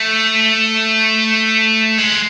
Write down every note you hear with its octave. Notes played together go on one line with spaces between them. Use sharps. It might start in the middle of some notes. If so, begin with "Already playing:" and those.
Already playing: A3
G#3